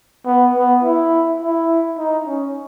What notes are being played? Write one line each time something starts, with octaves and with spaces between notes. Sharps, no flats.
B3
B3
E4
E4
D#4
C#4